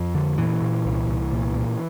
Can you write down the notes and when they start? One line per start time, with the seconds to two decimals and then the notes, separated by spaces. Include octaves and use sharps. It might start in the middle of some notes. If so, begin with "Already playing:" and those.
Already playing: F2 F3
0.15 D3
0.38 A#2 E3
0.62 A#2
0.86 C2
1.08 C2
1.32 A#2
1.55 A#2